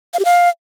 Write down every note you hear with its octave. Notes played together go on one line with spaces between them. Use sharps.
F5
G4
F5